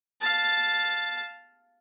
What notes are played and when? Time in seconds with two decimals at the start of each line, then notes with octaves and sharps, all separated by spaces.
0.21 F5 A5